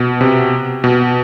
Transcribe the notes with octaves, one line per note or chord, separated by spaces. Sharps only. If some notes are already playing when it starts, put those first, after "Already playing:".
Already playing: B2
C3
B2